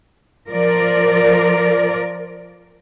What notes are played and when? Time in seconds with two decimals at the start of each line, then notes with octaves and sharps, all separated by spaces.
0.48 F3 A#4 D5